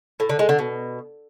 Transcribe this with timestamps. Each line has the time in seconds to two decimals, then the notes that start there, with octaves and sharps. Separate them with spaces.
0.20 A2
0.29 D3
0.39 G#3
0.49 D3
0.59 B2